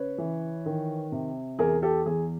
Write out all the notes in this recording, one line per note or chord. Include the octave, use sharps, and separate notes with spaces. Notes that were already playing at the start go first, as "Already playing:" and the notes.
Already playing: C#3 B4 C#5
E3
D#3
C3
E2 G#4 A#4
G4 A4
E2 G#4